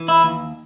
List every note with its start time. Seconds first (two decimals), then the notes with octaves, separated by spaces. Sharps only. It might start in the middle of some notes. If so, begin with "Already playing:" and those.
Already playing: E3
0.08 E4
0.23 D#2